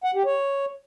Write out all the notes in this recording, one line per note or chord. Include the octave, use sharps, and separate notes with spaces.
F#5
G4
C#5